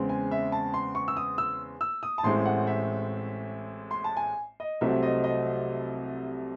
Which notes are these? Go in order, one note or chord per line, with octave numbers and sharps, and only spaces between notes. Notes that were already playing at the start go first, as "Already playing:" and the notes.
Already playing: E2 C#3 G#3 C4
G#5
E5
A5
C6
C#6
E6
D#6
E6
E6
D#6
A5
A1 A2 G#3 C4 C6
F#5
E5
C6
A5
G#5
D#5
C2 C3 F#3 A3 C4 E5
D#5
D#5